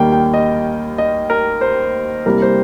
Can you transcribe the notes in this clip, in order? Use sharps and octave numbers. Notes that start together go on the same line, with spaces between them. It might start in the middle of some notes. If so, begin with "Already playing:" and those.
Already playing: D#2 D#3 G3 A#3 G5
G5
D#5
D#5
A#4
C5
C2 C3 G3 A#3 A#4
C5